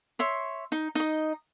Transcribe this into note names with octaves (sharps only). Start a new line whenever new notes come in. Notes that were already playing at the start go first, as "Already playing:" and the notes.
C#5 E5 C6
D#4
D#4 D#5